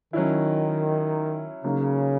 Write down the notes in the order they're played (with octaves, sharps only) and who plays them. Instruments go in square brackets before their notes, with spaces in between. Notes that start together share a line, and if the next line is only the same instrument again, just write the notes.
[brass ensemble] D#3 [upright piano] F#3 C#4 E4
[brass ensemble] C#3 [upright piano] F#3 A#3 D#4